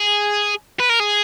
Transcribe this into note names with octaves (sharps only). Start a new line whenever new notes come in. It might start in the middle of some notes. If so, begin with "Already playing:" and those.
Already playing: G#4
B4
A#4
G#4